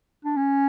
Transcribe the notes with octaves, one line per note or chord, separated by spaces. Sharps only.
D4
C#4